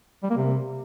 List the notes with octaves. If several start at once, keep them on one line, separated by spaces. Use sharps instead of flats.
G3
A#3
C3